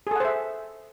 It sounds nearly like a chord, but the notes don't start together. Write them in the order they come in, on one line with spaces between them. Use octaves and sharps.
G#4 A4 F#5 C5 E5